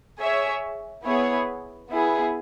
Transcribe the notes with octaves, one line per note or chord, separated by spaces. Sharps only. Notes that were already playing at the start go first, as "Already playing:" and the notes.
G#4 C#5 E5
B3 E4 G#4 C#5
B3 E4 G#4